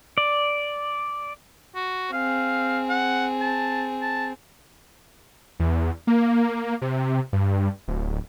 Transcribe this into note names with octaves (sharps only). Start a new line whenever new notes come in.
D5
F#4
C4 G#4 F5
F#5
A5
A5
E2
A#3
C3
G2
D1